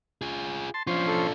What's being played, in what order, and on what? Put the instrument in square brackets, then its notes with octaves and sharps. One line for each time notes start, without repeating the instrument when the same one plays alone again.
[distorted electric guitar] F4 G#4
[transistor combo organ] A5 C6
[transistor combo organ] F3 C#4 C5 [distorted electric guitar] D4 F4
[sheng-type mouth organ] A4